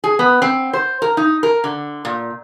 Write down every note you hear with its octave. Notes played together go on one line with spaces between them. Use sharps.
G#4
B3
C4
C5
A#4
D#4
A#4
D3
A#2